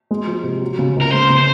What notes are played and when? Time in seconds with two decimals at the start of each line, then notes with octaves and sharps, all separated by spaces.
0.11 G#3
0.27 F3
0.44 C3
0.61 F#3
0.79 C#3
0.96 C#2
1.02 A#4
1.13 G#3 C5
1.30 C#3
1.38 C5